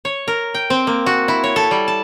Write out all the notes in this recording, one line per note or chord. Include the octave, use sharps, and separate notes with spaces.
C#5
A#4
G5
C4
A#3
F#4
E4
C#5
A4
G3
A5